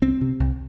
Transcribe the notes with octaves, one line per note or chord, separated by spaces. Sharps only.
C2 C4
C3
C2